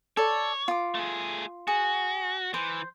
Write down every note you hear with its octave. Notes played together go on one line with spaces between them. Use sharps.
A4 C#5 D5
F4 D6
A3 G#4
F#4 G#4
E3 C5